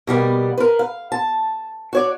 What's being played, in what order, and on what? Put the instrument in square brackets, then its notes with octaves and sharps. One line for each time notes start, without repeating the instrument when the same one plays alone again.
[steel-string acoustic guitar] B2 G3 A#3 B3
A#4 B4
F5
A5
F#4 C#5 D5